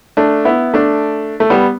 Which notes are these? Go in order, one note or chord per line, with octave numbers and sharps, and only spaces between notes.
A3 D4
B3 E4
A3 D4
A3
G3 B3